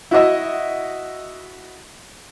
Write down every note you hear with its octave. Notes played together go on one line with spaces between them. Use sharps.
E4 F#4 D#5 E5